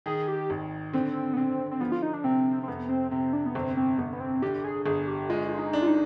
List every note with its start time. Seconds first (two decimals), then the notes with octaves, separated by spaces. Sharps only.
0.06 D#3 G#4
0.28 G4
0.50 G#1
0.93 D3 C4
1.33 B3
1.37 D3 C4
1.71 C4
1.81 F3 B3
1.92 F4
2.02 D#4
2.13 D4
2.24 C3 C4
2.63 C4
2.68 F2 B3
2.89 C4
3.11 C3 C4
3.33 D4
3.46 B3
3.55 G1 C4
3.77 C4
3.99 G1 B3
4.13 B3
4.20 C4
4.42 D3 G4
4.64 G#4
4.85 G1 G#4
5.07 G4
5.29 G#3 F4
5.49 F4
5.58 D#4
5.73 D4
5.83 F4
5.87 D#4